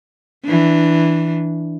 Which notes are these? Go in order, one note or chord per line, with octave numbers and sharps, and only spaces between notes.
E3 D4